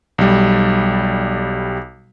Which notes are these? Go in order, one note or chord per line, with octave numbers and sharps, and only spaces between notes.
B1 G3